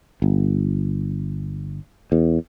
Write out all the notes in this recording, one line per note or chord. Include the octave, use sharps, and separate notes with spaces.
G1
E2